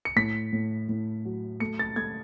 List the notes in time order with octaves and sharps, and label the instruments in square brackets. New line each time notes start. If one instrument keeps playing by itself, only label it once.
[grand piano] C#7
A2 B6
A2
A2
F#3
A3 C#7
A6
A3 G#6